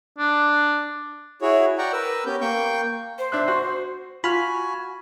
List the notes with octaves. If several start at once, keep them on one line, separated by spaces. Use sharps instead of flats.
D4
E4 F#4 G#4 C#5
D5 F#5 G5 A#5 C#6
A#4 B4 E6
B3 C#4 G4 G6
A#3 G5 C#6 G6
C5
D4 E5 F#6
F#4
F4 F#4 G#5 B5 F6